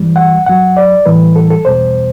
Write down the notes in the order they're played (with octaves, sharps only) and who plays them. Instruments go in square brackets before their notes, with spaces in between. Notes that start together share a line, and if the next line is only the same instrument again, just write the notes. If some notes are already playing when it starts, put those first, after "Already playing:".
Already playing: [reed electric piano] G2 E3 G3
F#5
G2 F#3 F#5
D5
A2 E3 G3 B4
A4
A4
E2 B2 G3 C5